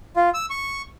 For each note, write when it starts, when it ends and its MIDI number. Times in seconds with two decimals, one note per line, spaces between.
0.16 0.29 65
0.34 0.46 88
0.50 0.82 85